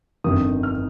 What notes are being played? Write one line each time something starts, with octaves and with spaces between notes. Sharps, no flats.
G1 F2 D#3 D#6
F6